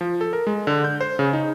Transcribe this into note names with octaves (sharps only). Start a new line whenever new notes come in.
F3
A4
A#4
G#3
D3
G6
C5
C#3
D#4